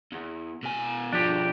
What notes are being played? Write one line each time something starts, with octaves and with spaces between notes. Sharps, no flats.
E2
B2 G#5
B2 F3 D4 G4